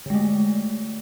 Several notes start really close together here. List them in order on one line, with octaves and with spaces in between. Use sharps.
D3 G#3 A3